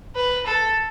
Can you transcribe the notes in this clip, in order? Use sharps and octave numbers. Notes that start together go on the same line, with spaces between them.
B4
A4